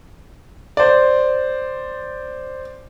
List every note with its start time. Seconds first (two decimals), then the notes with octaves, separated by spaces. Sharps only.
0.77 C5 D5